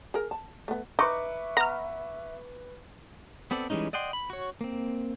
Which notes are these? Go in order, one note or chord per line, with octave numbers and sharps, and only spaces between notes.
G#4 A#4
A5
A3 B3
D#4 B4 E5 C#6 D6
B3 A#5 F6
B3 C4 A4 D5
E3 G3 G#3 C#4 D#4
D5 D#5 F#5 G5 C6
B5
F#4 C#5
A#3 C4